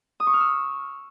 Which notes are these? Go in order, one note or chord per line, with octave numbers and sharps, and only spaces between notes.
D#6
C#6
F6
E6